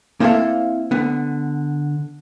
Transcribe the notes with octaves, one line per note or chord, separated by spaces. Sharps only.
A#3 C4 E4 A4 E5 F5
D3 B3